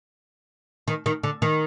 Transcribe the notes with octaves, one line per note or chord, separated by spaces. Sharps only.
D#3
D#3
D3
D#3